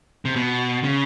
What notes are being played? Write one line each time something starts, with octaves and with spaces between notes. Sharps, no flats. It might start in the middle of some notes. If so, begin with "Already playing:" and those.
C3
B2
C#3